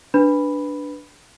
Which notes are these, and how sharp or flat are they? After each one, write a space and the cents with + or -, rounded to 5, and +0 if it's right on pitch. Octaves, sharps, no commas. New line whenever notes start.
D4 +0 B4 +0 B5 +0